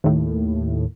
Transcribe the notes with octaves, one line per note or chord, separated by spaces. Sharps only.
D#2 A2